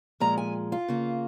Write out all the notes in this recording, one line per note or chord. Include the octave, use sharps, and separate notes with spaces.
A#2 F3 G#3 A#5
G#5
F4
C#3 A#3